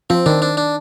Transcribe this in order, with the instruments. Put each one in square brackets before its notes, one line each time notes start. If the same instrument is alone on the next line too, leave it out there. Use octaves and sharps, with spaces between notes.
[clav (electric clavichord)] F3 [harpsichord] C4
[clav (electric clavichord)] D#3 [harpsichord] D4
[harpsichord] D4
D4